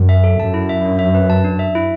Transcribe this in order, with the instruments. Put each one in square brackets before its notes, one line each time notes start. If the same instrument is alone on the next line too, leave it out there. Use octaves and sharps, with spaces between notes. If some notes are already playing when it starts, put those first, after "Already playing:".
Already playing: [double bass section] F#2
[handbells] E5
A4
[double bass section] F#2 [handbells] A5
[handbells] E4
E5
D4
E5
B4
A5
D4
E5
E4